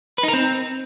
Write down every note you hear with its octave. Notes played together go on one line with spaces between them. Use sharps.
B4
D#4
A#4
C4